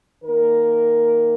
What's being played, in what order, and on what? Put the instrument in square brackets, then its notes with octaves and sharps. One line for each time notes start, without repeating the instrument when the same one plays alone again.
[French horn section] D#3 A#3 A#4